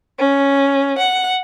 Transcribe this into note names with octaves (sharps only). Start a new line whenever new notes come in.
C#4
F#5